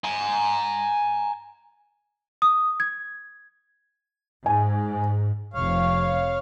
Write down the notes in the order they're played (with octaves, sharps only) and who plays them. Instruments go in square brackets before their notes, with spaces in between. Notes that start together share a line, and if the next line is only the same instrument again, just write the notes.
[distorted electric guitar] G#5 A#5
[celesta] D#6
G#6
[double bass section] G#2 [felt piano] G#5
[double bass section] F1 [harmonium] C#5 F5